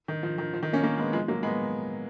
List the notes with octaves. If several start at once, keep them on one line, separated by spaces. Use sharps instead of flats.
D#3
F3
D#3
F3
D#3
A#3 C#4
A#3 C#4
G#3 B3
F3 G#3
F#3 A#3
G#3 B3